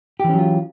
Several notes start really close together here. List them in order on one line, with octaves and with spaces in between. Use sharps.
G4 E3 C#4 F#3 F4